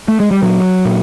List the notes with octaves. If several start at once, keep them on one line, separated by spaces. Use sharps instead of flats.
A3
G#3
G3
A#2 F#3
A#2